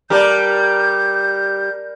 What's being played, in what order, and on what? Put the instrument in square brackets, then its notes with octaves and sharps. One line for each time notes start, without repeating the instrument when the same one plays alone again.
[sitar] G3 G4 [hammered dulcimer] A#4 D5 A5 [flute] G6